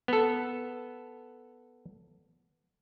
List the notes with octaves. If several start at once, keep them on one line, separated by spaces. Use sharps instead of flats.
B3 A4